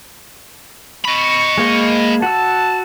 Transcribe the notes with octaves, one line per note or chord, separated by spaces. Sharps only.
D#5 B5 C#6
G#3 A#3 C5
F#4 A5 E6